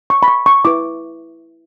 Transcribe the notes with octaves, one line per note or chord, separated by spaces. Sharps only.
C#6
B5
C#6
C#6
E4 B4 D6